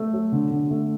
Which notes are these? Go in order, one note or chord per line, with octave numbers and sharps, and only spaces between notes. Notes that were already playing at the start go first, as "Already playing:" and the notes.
Already playing: A3
F#3
D3
D3
A3